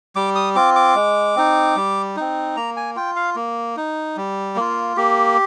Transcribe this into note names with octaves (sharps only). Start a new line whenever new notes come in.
G3 D6
D#6
C4 F4 D6
D6
G#3
C4 D#4
G3
C4 D#4
A#3 A#5
G#5
F4 G5
F5
A#3
D#4
G3
A#3 F4
A#3 G4